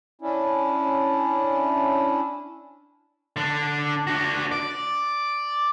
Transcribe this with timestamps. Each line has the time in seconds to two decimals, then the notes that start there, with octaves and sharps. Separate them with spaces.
0.22 C#4 D4 E4
3.36 D3 D4
4.07 D4 F#4
4.52 D5